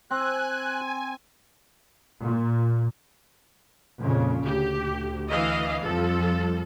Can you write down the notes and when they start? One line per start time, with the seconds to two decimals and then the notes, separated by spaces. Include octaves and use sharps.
0.11 C4 G#5 F#6
2.22 A#2
3.99 F2 A#2 C#3
4.45 D2 G4
5.30 E3 D#5 F5
5.84 F2 F3 G3 A4